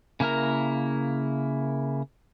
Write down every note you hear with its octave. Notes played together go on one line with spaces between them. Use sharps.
C#3 A#3 E4 A#4 A#5